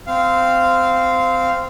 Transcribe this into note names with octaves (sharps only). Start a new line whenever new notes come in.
C4 F5